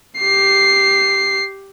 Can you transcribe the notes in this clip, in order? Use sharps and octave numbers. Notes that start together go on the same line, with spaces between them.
G4 C7